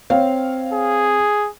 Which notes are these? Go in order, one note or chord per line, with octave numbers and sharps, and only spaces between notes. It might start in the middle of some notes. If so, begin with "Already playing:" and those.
C4 C#5 F5
G#4